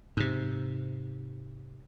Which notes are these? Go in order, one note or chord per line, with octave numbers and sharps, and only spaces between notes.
G#2 C3